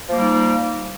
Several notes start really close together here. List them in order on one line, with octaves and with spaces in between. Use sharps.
F3 A#3 G3 D#4